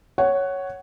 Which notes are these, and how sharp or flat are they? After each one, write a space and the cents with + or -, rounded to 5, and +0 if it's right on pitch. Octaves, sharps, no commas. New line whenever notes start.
C#5 +0 F#5 +15